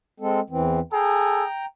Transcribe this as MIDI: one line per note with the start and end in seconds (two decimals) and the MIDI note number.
0.20 0.40 56
0.20 0.40 60
0.20 0.40 69
0.50 0.80 40
0.50 0.80 52
0.50 0.80 60
0.93 1.44 68
0.93 1.44 69
0.93 1.65 79
0.93 1.65 82